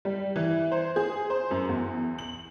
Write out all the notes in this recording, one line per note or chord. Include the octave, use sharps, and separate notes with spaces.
G3
E3
C5
G#4
C5
F#2
E2
F#7